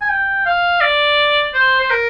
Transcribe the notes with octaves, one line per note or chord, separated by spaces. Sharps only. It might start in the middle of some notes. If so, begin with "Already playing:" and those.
G#5
G5
F5
D5
C5
C5
A#4